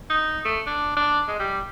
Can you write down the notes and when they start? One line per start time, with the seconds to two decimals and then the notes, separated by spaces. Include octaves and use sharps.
0.10 D#4
0.45 A3
0.67 D4
0.96 D4
1.28 G#3
1.40 G3